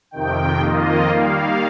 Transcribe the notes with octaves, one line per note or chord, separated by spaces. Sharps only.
F2 C3 D#3 G5
F2 D#3 A#3 F4 D#5
D#3 G3 A#3 F5